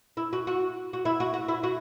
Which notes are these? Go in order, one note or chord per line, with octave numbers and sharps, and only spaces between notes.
E4
F#4
F#4
F#4
E4
F#4
F#4
E4
F#4